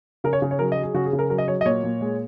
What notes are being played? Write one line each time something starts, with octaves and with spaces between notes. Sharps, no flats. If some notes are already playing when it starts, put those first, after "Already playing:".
C#3 A#4
C#5
C#3
C#5
F#3 A#4
D#5
F#3
G#4
C#3 F#4
G#4
C#3
A#4
F#3 A#4
D#5
F#3 C#5
D#5
A#2 C#5
A#2
G#3